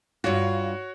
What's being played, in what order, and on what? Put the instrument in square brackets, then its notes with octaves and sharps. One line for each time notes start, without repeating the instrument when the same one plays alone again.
[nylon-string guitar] G2 F4 [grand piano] F#4 C#5